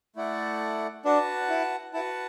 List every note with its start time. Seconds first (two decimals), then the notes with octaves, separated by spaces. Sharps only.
0.16 A3 E4 A4 D5 F#5
1.05 D4 F#4 B4 F#5 A5
1.49 E4
1.94 E4 F#4 B4 F#5 A5